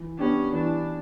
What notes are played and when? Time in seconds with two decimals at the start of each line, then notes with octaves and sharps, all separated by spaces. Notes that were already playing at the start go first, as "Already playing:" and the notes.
Already playing: E3
0.19 B3 C#4 D4 G4
0.53 E3 D4